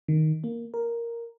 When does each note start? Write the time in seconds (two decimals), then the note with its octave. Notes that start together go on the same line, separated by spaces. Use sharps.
0.08 D#3
0.44 A#3
0.74 A#4